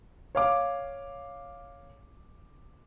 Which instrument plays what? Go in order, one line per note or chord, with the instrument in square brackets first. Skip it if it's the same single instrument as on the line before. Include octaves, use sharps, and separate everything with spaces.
[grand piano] C#5 F5 D6